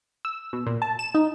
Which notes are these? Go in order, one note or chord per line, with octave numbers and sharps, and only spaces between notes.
E6
B2
A#2
A5
E7
D#4